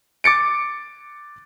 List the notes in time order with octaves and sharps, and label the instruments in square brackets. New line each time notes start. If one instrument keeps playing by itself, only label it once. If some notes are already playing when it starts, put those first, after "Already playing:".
[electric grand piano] D6 A6 C#7 D7